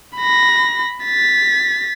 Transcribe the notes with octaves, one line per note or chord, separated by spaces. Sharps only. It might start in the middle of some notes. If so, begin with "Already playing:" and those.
B5 A#6
A6 B6